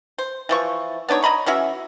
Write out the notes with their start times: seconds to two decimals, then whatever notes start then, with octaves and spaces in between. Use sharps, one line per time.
0.18 C5
0.49 E3 F3 C#6
1.08 B3 D4 D#4 C#5
1.22 D#5 A#5 B5 C#6
1.46 E3 C#4 F#4 E5